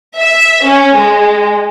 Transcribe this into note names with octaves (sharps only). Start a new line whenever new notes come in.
E5
C#4
G#3